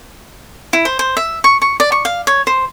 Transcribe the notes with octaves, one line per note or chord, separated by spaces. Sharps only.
E4
C5
C5
E5
C#6
C#6
D5
C#6
F5
C#5
C5